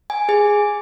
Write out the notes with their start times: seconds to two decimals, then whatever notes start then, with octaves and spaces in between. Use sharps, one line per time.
0.10 G#5
0.29 G#4 G#5